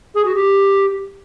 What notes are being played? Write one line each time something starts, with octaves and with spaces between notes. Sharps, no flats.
G#4
F#4
G4